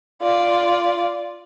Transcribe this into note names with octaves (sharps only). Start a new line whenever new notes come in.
F4 D5